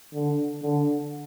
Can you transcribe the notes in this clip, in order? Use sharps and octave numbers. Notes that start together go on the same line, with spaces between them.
D3
D3